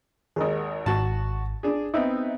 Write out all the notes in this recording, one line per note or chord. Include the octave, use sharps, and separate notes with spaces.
G#1 D#2 G#4 A#4 D#5
G#1 F#4 A5
D4 G#4
B3 C4 D#4 D#5 E5